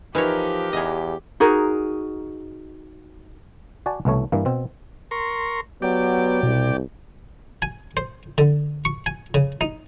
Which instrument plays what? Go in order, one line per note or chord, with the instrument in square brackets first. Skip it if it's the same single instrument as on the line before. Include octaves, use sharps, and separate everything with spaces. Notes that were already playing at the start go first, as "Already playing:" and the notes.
[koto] E3 C#5 [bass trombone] F3 [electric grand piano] D#4 A#4 B4 [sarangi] G4
[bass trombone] E2 [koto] G#4 D#5
[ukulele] D#4 F#4 G#4 A#4
[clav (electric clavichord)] F#4 D5 G#5 A5
C2 B2 E3 A3 C#5
G2 E3 A#3
B2 C4
[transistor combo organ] A#4 C6 C#6
[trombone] F#3 [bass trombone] B3 [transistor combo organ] G4 D5
[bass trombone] C2 [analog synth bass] B2
[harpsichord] G#5
C5
D3
C#6
G#5
C#3
D#4